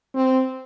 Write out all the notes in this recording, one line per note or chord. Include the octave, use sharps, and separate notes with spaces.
C4